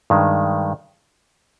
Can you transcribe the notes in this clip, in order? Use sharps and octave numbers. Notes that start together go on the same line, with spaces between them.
G2 D#3 G#3